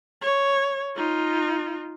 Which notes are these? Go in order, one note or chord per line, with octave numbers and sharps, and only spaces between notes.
C#5
D#4 F4